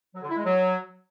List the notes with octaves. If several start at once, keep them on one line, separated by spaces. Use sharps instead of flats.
F#3
D3
E4
G#3
F#3